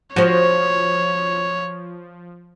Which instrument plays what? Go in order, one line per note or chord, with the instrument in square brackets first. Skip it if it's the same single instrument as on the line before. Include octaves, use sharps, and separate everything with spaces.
[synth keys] F3 [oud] F#4 C5 [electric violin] C#5